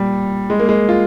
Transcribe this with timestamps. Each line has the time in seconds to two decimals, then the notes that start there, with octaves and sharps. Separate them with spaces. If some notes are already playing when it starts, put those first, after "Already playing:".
Already playing: A#2 G3
0.50 G#3
0.59 A#3
0.69 G#3
0.89 F4